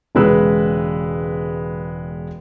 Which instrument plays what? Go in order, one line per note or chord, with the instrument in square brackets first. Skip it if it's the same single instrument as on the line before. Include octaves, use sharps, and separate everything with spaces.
[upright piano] E1 C#3 G#3 B4 E6